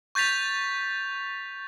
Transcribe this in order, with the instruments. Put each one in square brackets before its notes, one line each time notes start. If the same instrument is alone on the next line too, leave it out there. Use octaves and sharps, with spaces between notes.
[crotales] C#6 G6 A6 B6 F7